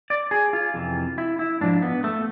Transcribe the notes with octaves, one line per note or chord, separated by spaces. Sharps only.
D5
G#4
F4
F2 C3 E3
E4
E4
G#2 F3 D4
B3
A3